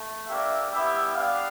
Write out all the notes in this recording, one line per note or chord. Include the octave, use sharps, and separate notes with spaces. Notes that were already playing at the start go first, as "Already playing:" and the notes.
Already playing: A3
A#3 D4 G4 E5
G3 B3 E4 G4 E5
B3 D4 G4 F5